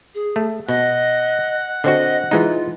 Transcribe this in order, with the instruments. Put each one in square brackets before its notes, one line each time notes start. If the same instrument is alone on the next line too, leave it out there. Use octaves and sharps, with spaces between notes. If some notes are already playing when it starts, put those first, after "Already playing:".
[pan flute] G#4
[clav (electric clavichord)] A3
[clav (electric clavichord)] B2 [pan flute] D#5 [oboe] F#5
[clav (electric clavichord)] D3 C4 F#4 [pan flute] D#5
[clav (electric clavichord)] E3 G#3 D#4 [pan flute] F4